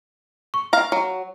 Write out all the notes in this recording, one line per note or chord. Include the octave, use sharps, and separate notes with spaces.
C#6
F5 A#5
F#3